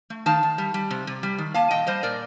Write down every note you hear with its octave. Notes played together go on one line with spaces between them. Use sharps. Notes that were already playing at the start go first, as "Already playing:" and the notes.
A3
D#3 F5 A5
D#3
G3
G3
C3
C3
G3
D#3
A#3 F5 A5
A#2 D#5 G5
G3 C5 D#5
A#2 A#4 D5